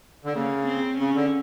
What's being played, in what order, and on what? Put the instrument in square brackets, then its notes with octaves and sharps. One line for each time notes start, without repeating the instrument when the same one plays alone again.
[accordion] D3
[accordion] C#3 [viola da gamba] A#3
[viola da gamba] C4
[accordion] C#3 [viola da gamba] C#4
[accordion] D3